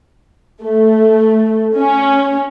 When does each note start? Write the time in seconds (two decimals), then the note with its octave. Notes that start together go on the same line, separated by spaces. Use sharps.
0.62 A3
1.78 C#4